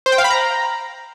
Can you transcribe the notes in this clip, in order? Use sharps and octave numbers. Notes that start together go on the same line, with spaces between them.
C5
G5
F5
B5
A#5